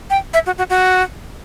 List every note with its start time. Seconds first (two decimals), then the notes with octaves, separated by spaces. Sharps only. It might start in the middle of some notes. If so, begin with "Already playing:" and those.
0.10 G5
0.34 E5
0.46 F#4
0.58 F#4
0.70 F#4